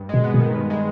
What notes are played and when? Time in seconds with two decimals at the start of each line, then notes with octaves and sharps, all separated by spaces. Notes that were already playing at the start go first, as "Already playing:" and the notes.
Already playing: G2
0.09 B2 G#3
0.24 B3
0.34 B2
0.40 D#3
0.55 G2
0.70 G#3